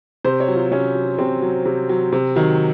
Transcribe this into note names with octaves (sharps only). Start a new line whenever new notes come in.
C3 C5
C#5
F#3
F4
C3 C#4
F#3
C3 C4
F#3
C3
F#3
C3
D#3 F#3